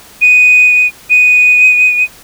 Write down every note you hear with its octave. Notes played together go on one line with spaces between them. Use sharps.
D#7
D#7